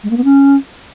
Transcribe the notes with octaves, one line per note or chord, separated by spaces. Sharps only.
G#3
A#3
B3
C#4